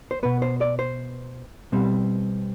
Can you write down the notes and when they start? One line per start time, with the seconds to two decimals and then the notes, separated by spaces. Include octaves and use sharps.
0.11 C5
0.23 B2 B3 B4
0.42 C5
0.61 D5
0.79 C5
1.72 B2 G3 C4